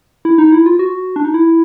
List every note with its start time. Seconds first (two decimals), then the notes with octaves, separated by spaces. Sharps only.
0.25 E4
0.38 D#4
0.52 E4
0.66 F4
0.79 F#4
1.16 D4
1.25 D#4
1.34 E4